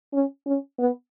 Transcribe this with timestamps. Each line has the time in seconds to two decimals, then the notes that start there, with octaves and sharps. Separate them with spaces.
0.13 C#4
0.47 C#4
0.79 B3